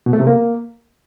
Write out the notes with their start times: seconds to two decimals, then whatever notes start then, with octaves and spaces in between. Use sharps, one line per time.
0.06 B2
0.13 A3
0.20 C3
0.27 A#3